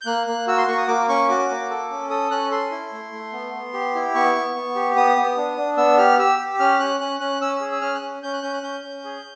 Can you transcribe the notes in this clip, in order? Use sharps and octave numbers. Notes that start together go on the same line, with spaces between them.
G6
A#3 F#6
A#3 F#6
F#4 E6
C6
A#3 C#6
D#6
A#3 D6
C#4 C#6
F#4 D6
A#3
A4
C#4
A4 D#6
C#4 F#6
A4 C6
E4
A3
A3
B3
B3
G4
E4
B3 C#6
B3
B3
G4
B3 D#6
B3
D4
D4
B3 E6
G4 F6
G4 E6
G4
C#4 F6
C#4 F#6
C#4 F#6
C#4 F#6
C#4 E6
G#4
E6
C#4 F6
F#6
C#4
C#4 G6
F#6
C#4 G6
F#6
C#4 G6
C#4
G#4